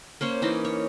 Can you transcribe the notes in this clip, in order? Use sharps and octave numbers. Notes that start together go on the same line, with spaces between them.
A#3 C#4 C5 C#5
E3 C#4 D#4 A#4
C#5